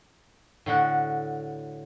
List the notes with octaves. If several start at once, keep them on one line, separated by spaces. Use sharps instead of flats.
A2 D3 F#4